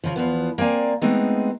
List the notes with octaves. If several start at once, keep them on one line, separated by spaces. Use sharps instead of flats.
C#3 F3
E2 F3 B3
A#3 C4 D5 G#5 A#5
G#3 A3 B3 C4 D#4 G#4